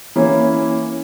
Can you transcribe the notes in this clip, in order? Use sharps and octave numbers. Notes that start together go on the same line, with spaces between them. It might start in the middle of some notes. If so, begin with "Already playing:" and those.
E3 A#3 C#4 E4